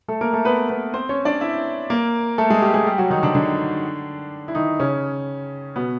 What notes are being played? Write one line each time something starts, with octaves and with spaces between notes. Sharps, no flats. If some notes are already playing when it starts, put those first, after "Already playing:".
A3 A4
A#3 A#4
A3 A4
B3 B4
B3 B4
C4 C5
C#4 C#5
D4 D5
E4 E5
A#3 A#4
A3 A4
G#3 G#4
G3 G4
G#3 G#4
G3 G4
F#3 F#4
D#3 D#4
D3 D4
D3 D4
E4
D#3 D#4
C#3 C#4
B2 B3